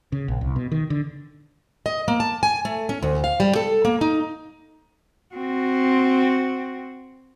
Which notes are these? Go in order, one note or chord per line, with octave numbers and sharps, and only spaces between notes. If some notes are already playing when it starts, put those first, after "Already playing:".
C#3
A#1
C2
B2
D#3
D3
D#5
A#3
A5
G#5
A3
C#4
D2
F5
G3
A4
A#3
D#4
C4 F#4